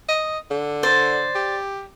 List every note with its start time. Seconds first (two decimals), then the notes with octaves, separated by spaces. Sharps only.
0.09 D#5
0.51 D3
0.83 C5 D5
1.35 G4